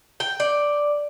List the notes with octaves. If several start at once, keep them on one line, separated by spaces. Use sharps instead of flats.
G5
D5